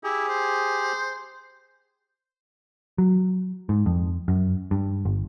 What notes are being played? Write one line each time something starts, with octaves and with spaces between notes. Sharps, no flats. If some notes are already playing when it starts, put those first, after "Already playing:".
E4 G4 G#4
C5
F#3
G#2
F2
F#2
G2
G1